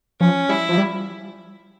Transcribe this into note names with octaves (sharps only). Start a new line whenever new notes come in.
F3 C#4
G3 E4
F3
G3